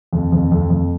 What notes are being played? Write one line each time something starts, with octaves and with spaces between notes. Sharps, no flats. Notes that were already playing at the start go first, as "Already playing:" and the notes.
F2
F2
F2
F2